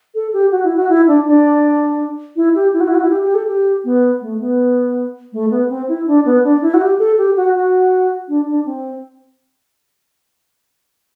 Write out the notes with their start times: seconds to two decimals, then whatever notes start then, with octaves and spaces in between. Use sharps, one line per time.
0.15 A4
0.33 G4
0.52 F#4
0.64 E4
0.76 F#4
0.89 E4
1.07 D4
1.26 D4
2.36 E4
2.55 G4
2.73 E4
2.80 F#4
2.88 E4
2.95 F#4
3.02 E4
3.10 G4
3.23 G4
3.35 A4
3.47 G4
3.84 B3
4.21 A3
4.40 B3
5.33 A3
5.51 B3
5.70 C4
5.88 E4
6.07 D4
6.25 B3
6.44 D4
6.62 E4
6.74 F#4
6.81 G4
6.99 A4
7.18 G4
7.36 F#4
7.55 F#4
8.29 D4
8.48 D4
8.66 C4